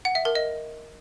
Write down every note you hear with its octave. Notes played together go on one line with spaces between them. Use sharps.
F#5
E5
A#4
D#5